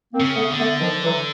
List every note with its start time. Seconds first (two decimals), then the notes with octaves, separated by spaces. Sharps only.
0.13 A#3 C4
0.20 C#3
0.36 A3 B3
0.51 D3
0.58 A3 B3
0.80 D#3 F3
1.03 E3 F#3